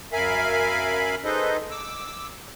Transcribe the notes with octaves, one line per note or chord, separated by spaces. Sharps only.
F#2 A#4 E5 F5 G#5 B5
D#4 G#4 A4 B4 C5 D#5
D6 E6